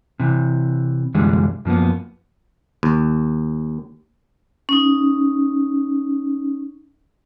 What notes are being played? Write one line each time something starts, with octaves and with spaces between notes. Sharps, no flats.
C3 E3
C2 F#2 D3 E3 G3 G#3
F#2 F3 A#3 B3
D#2
C#4 D#4